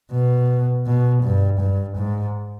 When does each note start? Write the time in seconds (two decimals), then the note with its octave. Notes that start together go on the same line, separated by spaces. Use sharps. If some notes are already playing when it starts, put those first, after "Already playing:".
0.11 B2
0.86 B2
1.23 G2
1.60 G2
1.98 G#2